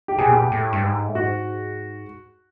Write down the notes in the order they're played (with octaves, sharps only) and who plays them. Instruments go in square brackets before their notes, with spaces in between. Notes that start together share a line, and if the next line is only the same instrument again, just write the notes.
[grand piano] G4
[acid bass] B2 [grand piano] G#4
[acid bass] A#2 [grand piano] G4
[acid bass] B2
A2
G2
G#2
A2
[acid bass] G#2 [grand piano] F#4